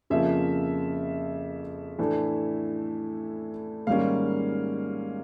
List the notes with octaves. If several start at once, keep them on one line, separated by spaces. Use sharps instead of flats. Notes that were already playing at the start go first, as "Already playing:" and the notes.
F2 C#3 F3 A#3 E5
A2 E3 A3 D4
G#2 D#3 G3 A#3 C#4 F5